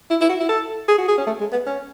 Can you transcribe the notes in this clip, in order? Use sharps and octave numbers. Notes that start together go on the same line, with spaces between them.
E4
E4
F#4
E4
A4
G#4
F#4
G#4
C#4
A3
G#3
B3
C#4